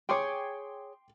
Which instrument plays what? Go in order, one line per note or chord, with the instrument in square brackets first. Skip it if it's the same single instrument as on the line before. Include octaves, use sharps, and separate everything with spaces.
[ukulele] G#4 C#5 [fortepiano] G5 C6 D6